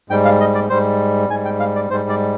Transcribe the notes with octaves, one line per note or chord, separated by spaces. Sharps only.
G#2 G3 G5
F5
D#5
D5
G#2 G3 C5
G#2 G3 G#5
G5
F5
D5
G#2 G3 C5
D5